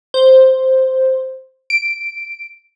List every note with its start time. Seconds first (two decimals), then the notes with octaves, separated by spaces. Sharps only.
0.14 C5
1.70 D7